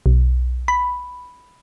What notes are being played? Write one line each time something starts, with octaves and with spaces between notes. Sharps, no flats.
B1
B5